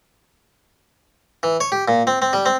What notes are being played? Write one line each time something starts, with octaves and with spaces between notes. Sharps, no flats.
E3
C#5
G4
A#2
C4
C4
G3
C4